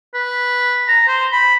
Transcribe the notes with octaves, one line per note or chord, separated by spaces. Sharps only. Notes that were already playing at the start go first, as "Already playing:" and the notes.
B4
A#5
C5
B5